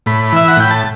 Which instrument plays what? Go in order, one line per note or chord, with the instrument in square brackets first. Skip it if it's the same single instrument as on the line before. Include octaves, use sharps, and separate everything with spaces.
[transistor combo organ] A2 B5
E3 E5
F#5
A2 G5
A5